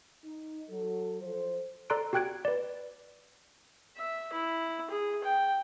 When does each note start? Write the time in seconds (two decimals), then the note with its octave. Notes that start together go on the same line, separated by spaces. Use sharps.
0.24 D#4
0.69 F#3 A4
1.21 F3 A4 C5
1.90 A4 D5 A#5 C6 F#6 D7
2.13 F#4 G4 G5 F#6 G#6 D7
2.45 B4 D5
3.97 E5
4.33 E4
4.90 G#4
5.24 G5